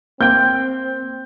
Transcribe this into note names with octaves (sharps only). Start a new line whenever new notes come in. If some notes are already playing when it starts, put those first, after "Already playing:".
A#3 C4 G5 G6